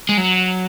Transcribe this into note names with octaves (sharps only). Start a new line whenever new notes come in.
G#3
F#3